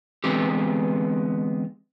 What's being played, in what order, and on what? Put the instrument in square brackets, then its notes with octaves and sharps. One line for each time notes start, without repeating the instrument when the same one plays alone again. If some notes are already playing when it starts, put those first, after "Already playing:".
[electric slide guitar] D3 E3 G#3 B3 C4 G4